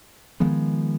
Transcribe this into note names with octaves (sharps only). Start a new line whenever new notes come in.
D#3 F3 G#3 B3